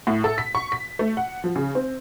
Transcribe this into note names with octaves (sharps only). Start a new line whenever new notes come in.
A2
A4
B6
C#6
B6
A3
F#5
F3
C#3
C4